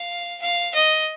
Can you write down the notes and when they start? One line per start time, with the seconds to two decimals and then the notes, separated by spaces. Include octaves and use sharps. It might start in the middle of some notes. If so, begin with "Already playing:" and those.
Already playing: F5
0.42 F5
0.74 D#5